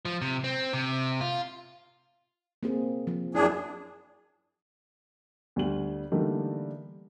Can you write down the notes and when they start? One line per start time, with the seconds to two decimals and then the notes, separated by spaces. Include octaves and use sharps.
0.05 F3
0.22 C3
0.44 C4
0.73 C3
1.21 F4
2.63 A#3 C4 G#4
3.07 F3
3.35 F#2 D4 E4 G#4
5.56 D2 G3 F#7
6.12 D3 E3 G3 A3 A#3 D#4